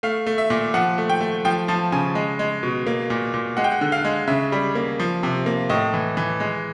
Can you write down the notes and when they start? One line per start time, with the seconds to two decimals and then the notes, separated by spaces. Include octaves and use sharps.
0.03 A3 F5
0.27 A3
0.38 E5
0.50 A#2
0.74 F3 F#5
0.98 A3
1.10 G5
1.21 A3
1.45 F3 G5
1.68 F3 A5
1.92 C#3 G#5
2.15 G#3
2.39 G#3
2.63 B2
2.87 A#3
3.10 A#2
3.34 A#2
3.57 G#3 F#5
3.64 G5
3.72 F#5
3.81 D3
3.92 F5
4.05 G#3
4.28 C#3 E5
4.52 G3
4.75 A#3
5.00 F3
5.23 C3
5.46 A#3
5.70 A2 D#5
5.94 E3
6.17 E3
6.40 G#3